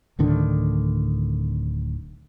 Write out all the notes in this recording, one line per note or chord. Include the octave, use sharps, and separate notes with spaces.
D1 A2 D3 D#3